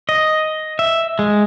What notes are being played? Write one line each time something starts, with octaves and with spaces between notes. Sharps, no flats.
D#5
E5
G#3